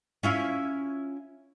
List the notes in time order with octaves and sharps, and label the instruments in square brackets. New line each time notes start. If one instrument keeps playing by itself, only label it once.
[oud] C#4 E4 F4